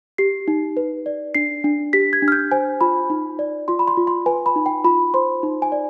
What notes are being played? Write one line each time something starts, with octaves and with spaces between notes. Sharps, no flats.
G4 C7
D#4
B4
D5
D4 C7
D4
G4 B6
G#6
D4
F6
G6
C5 G#5
F4 B5
D#4
D5
F4 C6
B5
C6
F4
C6
B4 G#5
B5
D#4
G5
F4 B5
C5 C6
D#4
G#5
D5